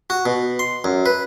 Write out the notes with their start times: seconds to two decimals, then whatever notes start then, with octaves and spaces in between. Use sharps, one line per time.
0.10 F#4
0.25 B2
0.59 C6
0.84 F#2
1.06 B4